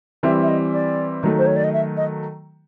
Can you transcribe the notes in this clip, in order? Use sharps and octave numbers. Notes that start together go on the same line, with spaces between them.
E3 G3 C4 E4 E5
E5
D#5
D5
D#3 F#3 A3
C5
C#5
D5
D#5
E5
D#5